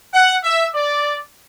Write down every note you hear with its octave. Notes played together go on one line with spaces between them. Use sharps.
F#5
E5
D5